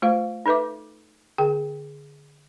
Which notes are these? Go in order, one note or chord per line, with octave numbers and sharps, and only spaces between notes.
A3 F4 C5 F5
D#4 A4 B4 E5 D6
D3 G#4 G5